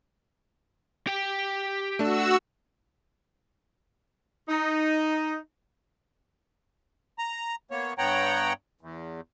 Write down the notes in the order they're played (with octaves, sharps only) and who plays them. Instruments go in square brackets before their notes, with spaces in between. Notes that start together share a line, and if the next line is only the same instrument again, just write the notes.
[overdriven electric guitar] G4 G5
[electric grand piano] A3 D4 [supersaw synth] F#4 E6
[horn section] D#4
[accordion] A#5
A#3 B3 C#5
G2 B3 C#5 F#5 G5 A#5
E2